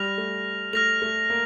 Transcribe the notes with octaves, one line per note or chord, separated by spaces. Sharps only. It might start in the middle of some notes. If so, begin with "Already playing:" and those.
Already playing: G3 F6 A#6 F7
A3
A3 F6 A#6 F7
A3
A#3